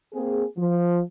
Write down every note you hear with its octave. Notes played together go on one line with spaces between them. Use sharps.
A#3 C4 G#4
F3